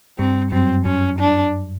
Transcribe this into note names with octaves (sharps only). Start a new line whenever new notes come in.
G2 G3 C4
F#2 F#3 C4
F#2 F#3 C#4
D4